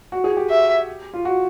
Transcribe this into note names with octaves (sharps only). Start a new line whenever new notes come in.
F#4
G#4
G4
E5
F4
F#4